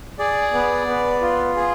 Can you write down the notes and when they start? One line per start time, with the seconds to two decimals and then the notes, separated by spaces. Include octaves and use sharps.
0.19 G#4 D5
0.53 B3
0.87 B3
1.22 F4
1.56 G#4